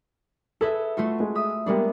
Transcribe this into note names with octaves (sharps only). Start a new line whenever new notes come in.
G#4 A4 B4 E5
A3 F4 F#4
G#3
E5 D#6
G3 G#3 A#3 B3 D4 G4